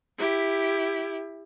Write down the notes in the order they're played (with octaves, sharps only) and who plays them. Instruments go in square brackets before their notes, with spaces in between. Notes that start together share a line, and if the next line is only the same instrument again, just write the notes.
[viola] E4 G4